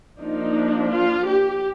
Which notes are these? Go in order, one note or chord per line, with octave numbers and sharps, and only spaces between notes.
F3 A#3 D4 D#4
F4
G4